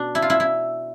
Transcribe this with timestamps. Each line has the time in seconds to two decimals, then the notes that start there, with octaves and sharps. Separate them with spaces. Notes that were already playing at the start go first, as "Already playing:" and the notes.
Already playing: B2 D4
0.15 E4
0.22 F4
0.30 E4
0.40 E4